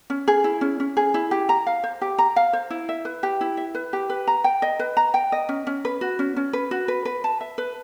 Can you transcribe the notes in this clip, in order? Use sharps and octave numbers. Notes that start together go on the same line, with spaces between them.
C#4
G#4
E4
C#4
C#4
G#4
E4
G4
A#5
F5
C5
G4
A#5
F5
C5
E4
E5
B4
G4
E4
E5
B4
G4
B4
A#5
G5
D#5
B4
A#5
G5
D#5
C#4
C#4
B4
F#4
C#4
C#4
B4
F#4
B4
B4
A5
E5
B4